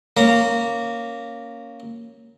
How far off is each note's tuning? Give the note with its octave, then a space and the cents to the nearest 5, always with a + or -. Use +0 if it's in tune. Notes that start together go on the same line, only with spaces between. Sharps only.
A#3 +0 C#4 +0 A#5 -20